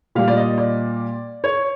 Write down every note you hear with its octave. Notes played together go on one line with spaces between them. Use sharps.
A#2 G3 F5
D5
D#5
D5
C#5